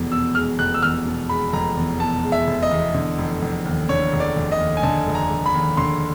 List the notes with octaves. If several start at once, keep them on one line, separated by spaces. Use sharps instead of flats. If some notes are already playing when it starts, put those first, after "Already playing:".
Already playing: F1 E2 B2 G#3
B2 E6
G#3 F6
F1 F#6
E6
E2 F6
B2
G#3 B5
F1 A#5
E2
B2 A5
G#3
E5
F1
D#5
E2
D3
F1
F1
D#2
D3 C#5
F1
D5
F1
D#5
D#2
G#5
D3 A5
F1
A#5
F1
B5
D#2
D3 C6